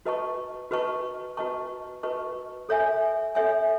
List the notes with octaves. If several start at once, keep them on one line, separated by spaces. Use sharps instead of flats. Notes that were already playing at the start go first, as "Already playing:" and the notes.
F#4 B4 D#5 A5 C#6
F#4 B4 D#5 A5 C#6
F#4 B4 D#5 A5 C#6
F#4 B4 D#5 A5 C#6
A4 C#5 E5 G#5
A4 C#5 E5 G#5